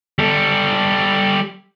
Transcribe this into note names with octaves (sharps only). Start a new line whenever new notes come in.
G3 A4